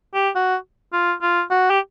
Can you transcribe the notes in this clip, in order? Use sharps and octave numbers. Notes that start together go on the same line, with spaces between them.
G4
F#4
F4
F4
F#4
G4